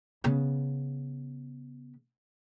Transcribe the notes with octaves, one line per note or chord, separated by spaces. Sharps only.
C#3 B3